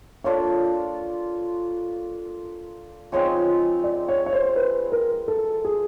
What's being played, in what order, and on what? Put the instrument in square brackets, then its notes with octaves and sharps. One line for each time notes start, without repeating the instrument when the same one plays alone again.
[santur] A#3 D4 F4 A4 [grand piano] C#5
[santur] F3 G#3 C4 D#4 [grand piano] C#5
[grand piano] D5
C#5
C#5
C5
B4
A#4
A4
G#4